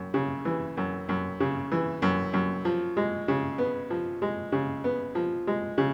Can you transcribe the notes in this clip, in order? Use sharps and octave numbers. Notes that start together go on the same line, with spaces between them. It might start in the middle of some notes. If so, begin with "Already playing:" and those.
Already playing: F#2
C#3
E3
F#2
F#2
C#3
E3
F#2
F#2
F3
G#3
C#3
B3
F3
G#3
C#3
B3
F3
G#3
C#3